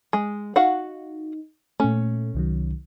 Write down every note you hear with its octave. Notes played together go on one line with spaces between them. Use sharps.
G#3
D#4 F#4 F5 F#5
A#2 A3 C#4
C2 D#3 F#3